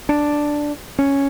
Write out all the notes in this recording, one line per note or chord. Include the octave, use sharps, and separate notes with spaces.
D4
C#4